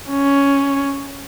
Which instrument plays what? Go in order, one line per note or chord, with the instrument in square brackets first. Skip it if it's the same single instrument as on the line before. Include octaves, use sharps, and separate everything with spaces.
[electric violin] C#4